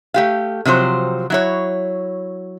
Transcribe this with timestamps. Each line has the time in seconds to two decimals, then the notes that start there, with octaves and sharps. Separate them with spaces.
0.14 A3 G4 F5
0.65 C3 F3 F#3 C5
1.30 F#3 E4 C#5